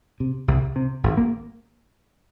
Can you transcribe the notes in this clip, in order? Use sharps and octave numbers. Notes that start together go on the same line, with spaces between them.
C3
C2
C3
G#1
A#3